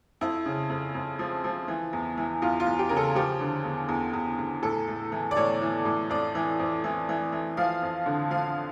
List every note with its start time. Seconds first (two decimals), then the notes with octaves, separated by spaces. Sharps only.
0.21 F2 E4
0.46 C#3
0.70 F2
0.94 F2
1.19 F3
1.44 F3
1.68 E3
1.93 E2
2.17 E3
2.42 E2 F4
2.60 F4
2.66 E2
2.79 G4
2.89 C#3 A#4
2.97 A4
3.15 F3 G4
3.41 D3
3.64 E2
3.89 E2
4.13 E2
4.38 E2
4.62 A2 A4
4.88 A2
5.12 E3
5.31 D5
5.36 A2 C#5
5.62 E3
5.85 A2
6.10 F2 D5
6.35 E3
6.59 F2
6.84 E3
7.09 E3
7.33 E3
7.57 F3 F5
7.82 F2
8.06 D3
8.30 F3 F5